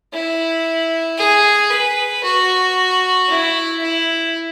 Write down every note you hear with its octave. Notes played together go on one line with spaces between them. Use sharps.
E4
G#4
B4
F#4
E4
E4